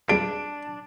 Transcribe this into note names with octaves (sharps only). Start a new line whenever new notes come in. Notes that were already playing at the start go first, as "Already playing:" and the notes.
C#2 C#3 G3 D4 D7